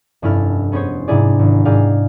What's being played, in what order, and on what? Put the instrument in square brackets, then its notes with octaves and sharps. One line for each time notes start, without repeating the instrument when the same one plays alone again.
[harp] F1 G2 C#4 E4 A4 F6
B3 C#4 G#4 C5 C#5
G#2 C3 D4 E4 G#4 D5
G#1
G#2 G#3 G#4 D5 F5 G5